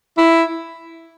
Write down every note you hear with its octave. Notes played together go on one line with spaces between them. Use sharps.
E4